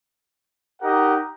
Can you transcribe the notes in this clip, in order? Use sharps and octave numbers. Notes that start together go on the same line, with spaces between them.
D#4 G4 A#4 D#5 F#5